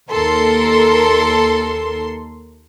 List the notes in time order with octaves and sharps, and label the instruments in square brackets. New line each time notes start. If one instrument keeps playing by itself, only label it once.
[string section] D#2 A4 A#4 C6